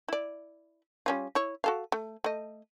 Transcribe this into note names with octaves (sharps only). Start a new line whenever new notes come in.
E4 D5
G3 C#4 F4
E4 C#5
F#4 A4 F5
A3
A3 D#5